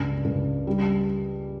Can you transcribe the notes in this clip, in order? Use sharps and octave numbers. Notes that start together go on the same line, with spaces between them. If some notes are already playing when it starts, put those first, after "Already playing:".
Already playing: C#2 G2
C#2
G3